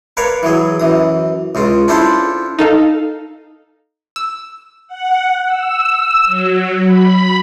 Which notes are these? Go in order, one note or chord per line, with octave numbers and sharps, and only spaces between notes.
A#4 B4 C#5 D5 F5
E3 F#3 G#4
F#2 E3 D#6
C#2 C#3 F4
C#4 D4 E4 F4 A4 C5
D#4 A4 F5
E6
F#5
E6
F#3
B5